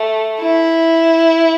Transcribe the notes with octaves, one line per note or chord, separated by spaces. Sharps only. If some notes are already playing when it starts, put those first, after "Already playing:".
Already playing: A3
E4